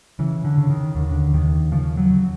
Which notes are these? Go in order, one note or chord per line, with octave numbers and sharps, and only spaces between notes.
C#3 E3
D3
C#3
D#3
D#2 D3
D3
D#2 D#3
C#3 F3
F#3
C#3